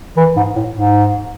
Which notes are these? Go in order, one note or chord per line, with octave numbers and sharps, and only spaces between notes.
E3
G#2
A2
G#2